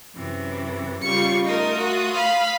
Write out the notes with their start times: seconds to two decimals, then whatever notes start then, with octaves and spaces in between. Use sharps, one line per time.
0.15 F#2 C3 E3
1.01 C#3 G3 F4 C#6 C#7
1.44 A3 D#4 F4 A#4 D#6
1.78 F#4
2.13 F5 B5